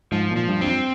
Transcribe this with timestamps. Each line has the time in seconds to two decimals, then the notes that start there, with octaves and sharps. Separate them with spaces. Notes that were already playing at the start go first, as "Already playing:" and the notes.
0.12 G#2 F3
0.31 A#2
0.36 F3
0.49 G2
0.61 G2 C4
0.67 F2